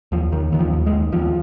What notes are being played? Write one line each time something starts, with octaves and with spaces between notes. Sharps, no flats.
D#2 F3
D#2 D#3
D#2 D#3
F3
D#2
G#3
D#2
D#2 F3